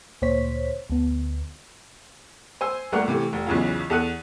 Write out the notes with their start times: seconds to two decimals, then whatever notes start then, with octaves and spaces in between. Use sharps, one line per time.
0.22 D2 A#2 C5 C#5 B6
0.90 D2 B3
2.61 C5 G#5 E6
2.92 G1 A3 A#3 D4 F#5 F6
3.08 C3 E3 A3
3.33 F1
3.46 B1 E2 C#3 E3 F4
3.90 E2 A4 F#5 F#6 D#7